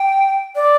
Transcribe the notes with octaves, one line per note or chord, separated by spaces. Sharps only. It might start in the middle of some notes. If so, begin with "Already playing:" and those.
Already playing: G5
D5